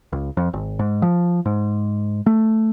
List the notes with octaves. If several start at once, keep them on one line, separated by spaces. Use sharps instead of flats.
C#2
F2
G#1
G#2
F3
G#2
A3